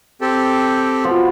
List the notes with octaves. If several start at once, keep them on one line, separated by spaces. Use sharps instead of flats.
C4 G4 A4
B2 F3 B5